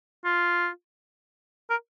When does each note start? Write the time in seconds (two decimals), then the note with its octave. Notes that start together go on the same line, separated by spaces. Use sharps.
0.25 F4
1.70 A#4